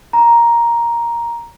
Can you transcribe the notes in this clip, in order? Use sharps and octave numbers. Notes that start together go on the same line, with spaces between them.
A#5